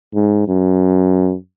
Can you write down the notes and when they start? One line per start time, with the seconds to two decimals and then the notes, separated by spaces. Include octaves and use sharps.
0.15 G#2
0.48 F#2